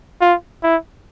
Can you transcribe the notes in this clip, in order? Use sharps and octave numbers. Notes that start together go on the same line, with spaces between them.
F4
E4